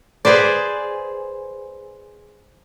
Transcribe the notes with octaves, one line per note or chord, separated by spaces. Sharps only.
G#4 B4 C5 D5